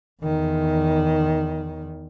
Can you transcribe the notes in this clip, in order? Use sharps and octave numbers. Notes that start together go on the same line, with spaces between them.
E2 D#3